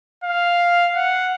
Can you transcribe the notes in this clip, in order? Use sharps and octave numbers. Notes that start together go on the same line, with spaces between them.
F5
F#5